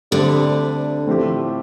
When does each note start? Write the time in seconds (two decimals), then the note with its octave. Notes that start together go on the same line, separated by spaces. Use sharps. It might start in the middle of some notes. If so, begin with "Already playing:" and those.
0.11 D2 D3 G3 C4 G4
1.07 A2 F3 C4 E4 G4